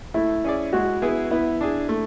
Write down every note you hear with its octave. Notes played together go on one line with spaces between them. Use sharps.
A3 E4
C#4 G#4 D5
G#3 F#4
B3 E4 G#4
B3 E4
D4 G#4
A3